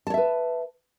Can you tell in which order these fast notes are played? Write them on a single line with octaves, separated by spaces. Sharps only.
A5 C#5 E5 B4